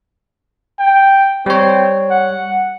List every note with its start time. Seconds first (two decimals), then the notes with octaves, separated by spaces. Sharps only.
0.79 G5
1.46 G3 C4 C#5
2.10 F#5